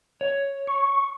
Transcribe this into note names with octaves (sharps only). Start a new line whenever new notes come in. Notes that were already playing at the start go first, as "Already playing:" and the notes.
C#5
C#6